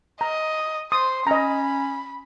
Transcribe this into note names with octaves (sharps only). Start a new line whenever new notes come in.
D#5 A#5
C5 C6 D#6
C#4 D#5 A#5 B5